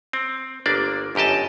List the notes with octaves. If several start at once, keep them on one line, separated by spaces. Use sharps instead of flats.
C4
G1 A#3 D4 D5
G1 F#2 G4 D#5 A5